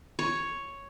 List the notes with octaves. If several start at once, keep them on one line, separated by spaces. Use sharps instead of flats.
C#5